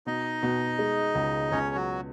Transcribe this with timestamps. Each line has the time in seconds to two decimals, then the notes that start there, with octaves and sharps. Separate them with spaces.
0.06 B2 D#4 D#5
0.43 B2
0.79 G#3
1.15 C#2
1.51 C#2 C#4 C#5
1.75 F#3 F#4